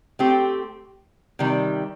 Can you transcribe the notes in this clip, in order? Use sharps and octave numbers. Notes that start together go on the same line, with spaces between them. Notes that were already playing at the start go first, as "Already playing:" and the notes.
A3 C4 G4
C3 D#3 G3